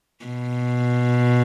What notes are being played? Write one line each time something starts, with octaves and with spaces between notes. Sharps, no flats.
B2